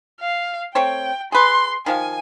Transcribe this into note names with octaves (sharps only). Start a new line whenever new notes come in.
F5
A3 C4 C#5 G5
G#4 B4 C6
D#3 F3 F5 G#5